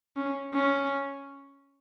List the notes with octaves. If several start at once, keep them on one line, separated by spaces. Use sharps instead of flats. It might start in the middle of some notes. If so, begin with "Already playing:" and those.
C#4
C#4